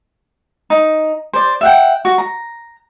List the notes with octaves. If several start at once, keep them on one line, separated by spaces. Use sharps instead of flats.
D#4
C5 D5
E5 F#5 G5
F#4
A#5